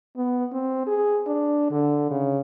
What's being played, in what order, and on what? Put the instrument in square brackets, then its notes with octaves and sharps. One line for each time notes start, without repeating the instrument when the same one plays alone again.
[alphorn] B3
C4
G#4
D4
D3
C#3